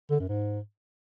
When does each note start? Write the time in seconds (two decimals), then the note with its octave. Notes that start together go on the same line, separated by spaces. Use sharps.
0.11 D3
0.20 F#2
0.29 G#2